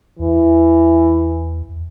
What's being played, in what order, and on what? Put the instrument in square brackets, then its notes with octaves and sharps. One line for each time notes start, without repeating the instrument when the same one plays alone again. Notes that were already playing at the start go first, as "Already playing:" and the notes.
[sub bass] E2 [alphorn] E3